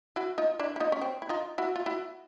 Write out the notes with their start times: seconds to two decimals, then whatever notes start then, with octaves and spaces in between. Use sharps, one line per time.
0.16 E4 F#4
0.38 D#4 F4
0.59 D4 E4
0.76 E4
0.80 D#4 F4
0.92 C#4
1.01 C4
1.22 E4
1.29 D#4 F4
1.58 E4 F#4
1.76 F4
1.86 E4 F#4